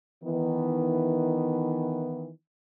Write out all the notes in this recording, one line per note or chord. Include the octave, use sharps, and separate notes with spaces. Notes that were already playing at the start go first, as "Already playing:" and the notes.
D#3 E3 B3